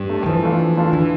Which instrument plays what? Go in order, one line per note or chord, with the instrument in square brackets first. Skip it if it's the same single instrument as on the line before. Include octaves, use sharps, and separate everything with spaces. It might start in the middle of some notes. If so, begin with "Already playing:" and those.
Already playing: [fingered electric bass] G2
[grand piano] A3 D4
[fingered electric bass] E3 [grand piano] F3
[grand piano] A3 D4 F4 A4
F3
A3 D4 F4 A4
[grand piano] D3 [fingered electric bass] E3